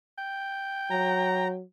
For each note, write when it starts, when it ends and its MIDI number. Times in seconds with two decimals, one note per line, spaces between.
0.18 1.52 79
0.91 1.62 54
0.91 1.48 82